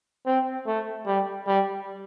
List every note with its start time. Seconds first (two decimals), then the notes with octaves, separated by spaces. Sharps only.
0.26 C4
0.67 A3
1.06 G3
1.47 G3